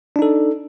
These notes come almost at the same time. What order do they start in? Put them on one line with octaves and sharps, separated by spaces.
D4 D#4 A4